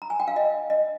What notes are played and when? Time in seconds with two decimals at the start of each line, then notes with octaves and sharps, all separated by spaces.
0.02 A#5
0.10 G#5
0.20 G5
0.28 F5
0.36 D#5
0.70 D#5